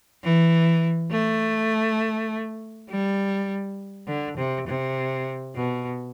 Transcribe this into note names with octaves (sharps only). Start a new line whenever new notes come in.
E3
A3
G3
D3
C3
C3
B2